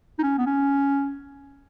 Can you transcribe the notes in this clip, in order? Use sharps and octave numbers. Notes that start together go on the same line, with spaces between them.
D#4
C#4
B3
C#4